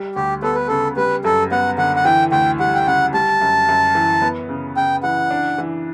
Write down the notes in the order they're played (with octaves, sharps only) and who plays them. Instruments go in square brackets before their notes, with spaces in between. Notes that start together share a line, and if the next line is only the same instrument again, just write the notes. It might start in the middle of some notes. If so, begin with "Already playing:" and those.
Already playing: [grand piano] G3
[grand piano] D2 [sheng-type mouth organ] G4
[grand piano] B3 [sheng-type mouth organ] A4
[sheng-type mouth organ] B4
[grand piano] C#3 [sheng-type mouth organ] A4
[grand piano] G3 [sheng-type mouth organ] B4
[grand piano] F#2 [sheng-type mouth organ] A4
[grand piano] B3 [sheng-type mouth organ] F#5
[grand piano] D3 [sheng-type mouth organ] F#5
[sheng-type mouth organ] F#5
[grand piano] E3 [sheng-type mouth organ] G5
[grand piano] D2 [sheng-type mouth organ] G5
[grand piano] G3 [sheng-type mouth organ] F#5
[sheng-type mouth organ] G5
[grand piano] C#3 [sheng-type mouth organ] F#5
[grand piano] G3 [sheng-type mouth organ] A5
[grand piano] F#2
F#2
E3
B3
C#3
[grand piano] C#3 [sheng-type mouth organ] G5
[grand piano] E3 [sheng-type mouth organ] F#5
[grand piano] D4
E3